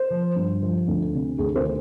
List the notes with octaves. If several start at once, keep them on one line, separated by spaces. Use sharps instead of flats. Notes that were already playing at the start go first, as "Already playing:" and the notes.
Already playing: C5
F3
G2
F3
D2
C3
D2 G#4
C5
D3